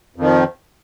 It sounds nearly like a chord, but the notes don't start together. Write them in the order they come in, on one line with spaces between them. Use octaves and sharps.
F2 D#3 F3